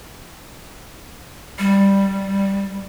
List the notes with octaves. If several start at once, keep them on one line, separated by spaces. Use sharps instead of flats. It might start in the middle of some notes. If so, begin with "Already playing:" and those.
G3